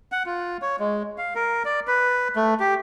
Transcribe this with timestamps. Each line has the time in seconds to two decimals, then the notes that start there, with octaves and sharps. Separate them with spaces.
0.12 F#5
0.26 F4
0.62 C#5
0.79 G#3
1.18 F5
1.35 A#4
1.65 D5
1.88 B4
2.36 A3
2.60 G4